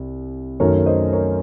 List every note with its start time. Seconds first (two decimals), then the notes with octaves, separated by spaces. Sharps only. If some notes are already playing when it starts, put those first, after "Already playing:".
Already playing: C2
0.60 F#2 D#3 F#3 A3 A#4 C#5
0.86 C5 D#5
1.13 A#4 C#5